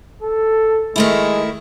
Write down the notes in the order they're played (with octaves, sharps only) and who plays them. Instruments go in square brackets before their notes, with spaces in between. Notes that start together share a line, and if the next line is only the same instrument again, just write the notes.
[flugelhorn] A4
[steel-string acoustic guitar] D#3 A3 E4 [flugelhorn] G#3